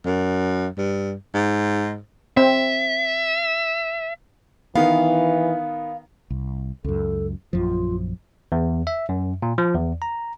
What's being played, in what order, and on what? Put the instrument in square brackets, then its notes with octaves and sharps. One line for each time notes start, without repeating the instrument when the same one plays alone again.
[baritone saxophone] F#2
G2
G#2
[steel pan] C4 [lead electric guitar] E5
[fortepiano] D#3 B3 [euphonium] E3 [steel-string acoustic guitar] F5
[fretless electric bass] C2
[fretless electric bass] C#2 F#2 [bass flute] A4
[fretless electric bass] A#1 F#2 F3 [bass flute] F4
[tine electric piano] E2
E5
F#2
A#2
F3
E2
A#5